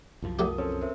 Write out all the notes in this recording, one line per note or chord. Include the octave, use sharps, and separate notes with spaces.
C2 F#2 F3
F#3 A3 G4 A#4 D#6
C4 C#4 A4
A#4 C5 E5